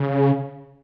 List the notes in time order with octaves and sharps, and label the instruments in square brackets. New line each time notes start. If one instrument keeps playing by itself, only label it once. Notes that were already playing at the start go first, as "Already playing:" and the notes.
Already playing: [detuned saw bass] C#3